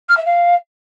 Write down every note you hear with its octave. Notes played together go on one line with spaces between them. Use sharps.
F6
E5
F5